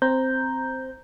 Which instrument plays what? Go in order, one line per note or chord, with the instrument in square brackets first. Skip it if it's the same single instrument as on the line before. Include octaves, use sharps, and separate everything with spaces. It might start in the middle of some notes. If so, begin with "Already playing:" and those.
[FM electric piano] C4 C5 A#5 G6